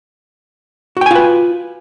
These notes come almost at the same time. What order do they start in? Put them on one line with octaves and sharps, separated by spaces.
F#4 G5 G#5 F4 B4